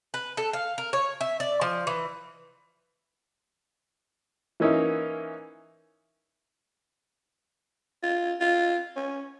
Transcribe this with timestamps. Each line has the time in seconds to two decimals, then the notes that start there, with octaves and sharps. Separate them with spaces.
0.14 B4
0.37 A4
0.53 F5
0.78 A#4
0.93 C#5
1.21 E5
1.40 D5
1.61 F3
1.87 E3
4.60 E3 A#3 C#4 D#4 E4
8.03 F4
8.40 F4
8.96 C#4